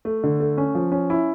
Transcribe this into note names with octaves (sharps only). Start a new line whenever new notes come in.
A3
D3
A3
C#4
F3
C#4
E4